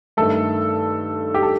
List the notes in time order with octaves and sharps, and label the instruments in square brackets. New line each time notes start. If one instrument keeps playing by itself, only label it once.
[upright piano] G2 D#3 A3 A4
G4
A4